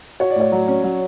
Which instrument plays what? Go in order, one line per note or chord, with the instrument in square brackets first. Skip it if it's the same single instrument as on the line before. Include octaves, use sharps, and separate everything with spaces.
[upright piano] F#4 [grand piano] C#5
[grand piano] D5
[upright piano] A2 [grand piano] C#5
[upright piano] F#3
C#4
F#3